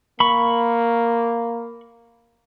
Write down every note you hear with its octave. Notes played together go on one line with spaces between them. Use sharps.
A#3 B5 C#6